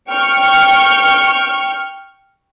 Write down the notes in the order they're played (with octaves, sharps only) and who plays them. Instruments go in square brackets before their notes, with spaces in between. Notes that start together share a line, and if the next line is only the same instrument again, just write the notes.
[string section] G5 C#6 F6